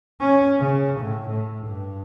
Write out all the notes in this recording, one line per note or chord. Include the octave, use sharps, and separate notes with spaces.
C#4
C#3
A2
A2
G2